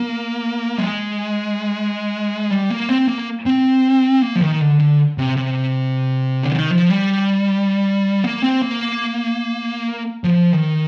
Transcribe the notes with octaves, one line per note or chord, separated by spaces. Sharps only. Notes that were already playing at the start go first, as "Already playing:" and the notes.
Already playing: A#3
G#3
G3
A#3
C4
A#3
C4
A#3
F3
D#3
D3
D3
C3
C3
D3
D#3
F3
G3
A#3
C4
A#3
F3
D#3